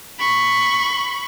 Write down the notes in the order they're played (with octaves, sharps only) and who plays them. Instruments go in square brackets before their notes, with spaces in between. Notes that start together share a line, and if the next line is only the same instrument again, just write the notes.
[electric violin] B5 C#6